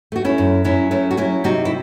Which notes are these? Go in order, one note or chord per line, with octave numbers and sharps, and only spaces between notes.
A3 F#4
C#4 E4
F#2
F#3 C#4 E4
A3 C#4 E4
F#4
F#3 C#4 E4
C3 D#4 F#4
E4